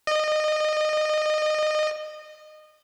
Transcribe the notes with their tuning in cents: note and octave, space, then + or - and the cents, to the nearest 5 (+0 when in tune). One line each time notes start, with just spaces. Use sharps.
D#5 -25